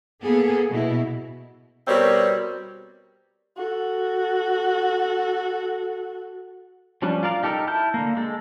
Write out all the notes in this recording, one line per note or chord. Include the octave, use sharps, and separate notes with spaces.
A#3 B3 G#4 A4
B2 E4
B2 G3 C4 A#4 C#5
F#4 A4
F3 G3 C#4 D4
F4 A#4 D5 F5
D#4 G4 A4 A#4 F6
E4 A5 F6 G6
D3 A#3
G#3 A4